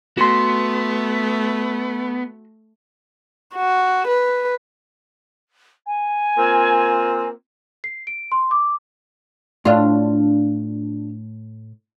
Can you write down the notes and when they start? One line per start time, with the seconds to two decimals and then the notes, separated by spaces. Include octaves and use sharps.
0.17 A3 B3 F#4 C6
3.55 F#4
4.08 B4
5.86 G#5
6.38 A#3 C4 F4
7.84 C7
8.07 D7
8.32 C6
8.51 D6
9.65 A2 D4 F4